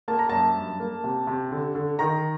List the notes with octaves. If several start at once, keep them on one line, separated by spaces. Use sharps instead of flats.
A#3 A5
A#5
F#2 A5
G2
A#3
C3
C3
D3
D3
D#3 A#5